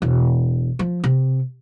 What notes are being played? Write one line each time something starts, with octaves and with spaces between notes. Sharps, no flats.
E1
F3
C3